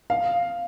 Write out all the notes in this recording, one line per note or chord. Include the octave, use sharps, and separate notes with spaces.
F5